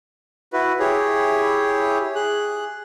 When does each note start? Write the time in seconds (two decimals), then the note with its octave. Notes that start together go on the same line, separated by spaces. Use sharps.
0.53 E4 F#4 B4
0.79 E4 G4 G#4 C#5
2.15 G#4 F#6